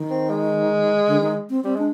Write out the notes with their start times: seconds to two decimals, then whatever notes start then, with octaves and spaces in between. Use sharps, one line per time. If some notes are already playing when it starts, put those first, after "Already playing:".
Already playing: D#3
0.10 C4
0.30 G#3
1.07 D3
1.20 D#3
1.50 C4
1.64 G3 C4
1.76 G#3 D4